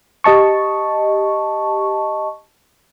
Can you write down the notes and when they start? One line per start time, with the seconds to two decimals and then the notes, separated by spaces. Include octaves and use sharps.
0.24 G4 D#5 A5 C#6